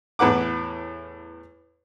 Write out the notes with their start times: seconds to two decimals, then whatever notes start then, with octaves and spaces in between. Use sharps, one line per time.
0.19 E2 A2 B4 F#5 D6